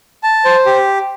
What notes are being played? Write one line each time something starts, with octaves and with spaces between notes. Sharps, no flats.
A5
C5
G4